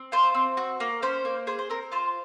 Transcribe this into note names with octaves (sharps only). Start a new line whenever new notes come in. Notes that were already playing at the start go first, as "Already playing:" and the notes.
Already playing: C4
F4 C5
C4
F#4
A#3
C#4 C5
A#3
G#4 C5
C5
C4 A#4
F4 C5